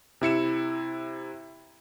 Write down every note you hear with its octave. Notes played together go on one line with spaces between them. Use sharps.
C3 E4 C#7 E7